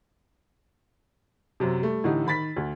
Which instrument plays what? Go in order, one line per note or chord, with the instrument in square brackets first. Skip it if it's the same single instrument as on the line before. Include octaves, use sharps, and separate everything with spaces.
[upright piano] F#2 C3
G3 A3
A2 D3 E3 D#4 G4
D#3 B5 A6 B6
D2